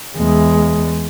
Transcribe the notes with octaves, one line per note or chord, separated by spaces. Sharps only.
E2 G#3